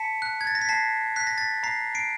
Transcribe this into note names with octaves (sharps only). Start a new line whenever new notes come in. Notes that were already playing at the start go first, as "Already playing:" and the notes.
Already playing: A5 B6 C#7
F#6
G#6
A6
A#6
B6
A5 A#6 C7
F#6 B6
A#6
A6 B6
A#5 A#6 C7
C7 D7